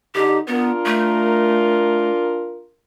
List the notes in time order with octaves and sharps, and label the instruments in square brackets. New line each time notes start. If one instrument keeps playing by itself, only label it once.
[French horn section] D3 D#4 [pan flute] G4
[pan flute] B3 [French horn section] D4 F4 A#4
[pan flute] A3